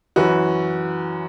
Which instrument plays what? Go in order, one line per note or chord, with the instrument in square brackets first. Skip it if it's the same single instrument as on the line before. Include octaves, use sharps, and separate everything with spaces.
[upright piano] F#2 E3 F#4 B4